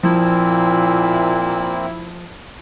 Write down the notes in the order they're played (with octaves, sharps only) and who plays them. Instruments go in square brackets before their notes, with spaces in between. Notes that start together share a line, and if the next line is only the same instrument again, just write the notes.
[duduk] A#2 [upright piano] F3 [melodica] A#3 C4 [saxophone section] E4